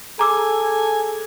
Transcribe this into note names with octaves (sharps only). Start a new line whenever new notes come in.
G#4 A4 G#5 A#5 D6 E6